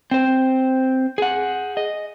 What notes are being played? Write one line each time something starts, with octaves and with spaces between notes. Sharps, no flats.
C4 C5
G#4 F#5
D#5